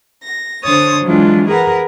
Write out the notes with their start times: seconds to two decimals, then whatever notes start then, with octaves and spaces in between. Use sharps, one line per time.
0.23 A#6
0.63 D3 D4 C5 C#5 D#6 A6
1.04 E3 F#3 G#3 D4 F4
1.48 G#4 A#4 B4 F#5 A#5